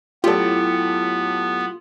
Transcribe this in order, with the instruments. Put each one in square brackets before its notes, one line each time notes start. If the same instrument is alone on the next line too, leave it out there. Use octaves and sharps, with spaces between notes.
[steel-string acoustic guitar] A2 F#3 [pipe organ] B3 [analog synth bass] F4 [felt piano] G4 A4